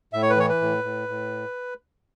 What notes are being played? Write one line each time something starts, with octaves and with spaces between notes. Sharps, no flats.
A2 E5
C#5
B4
E3 C#5
B4
A2
A2
A2